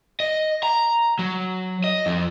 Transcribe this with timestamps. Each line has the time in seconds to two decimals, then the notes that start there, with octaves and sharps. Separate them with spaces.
0.20 D#5
0.63 A#5
1.19 F#3
1.84 D#5
2.06 F2